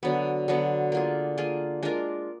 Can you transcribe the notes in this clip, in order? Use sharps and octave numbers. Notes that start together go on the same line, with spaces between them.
D3 F#3 B3
D3 F#3 B3
A#3 F4 G#4
A#3 F4 G#4
G#3 D4 F4 A#4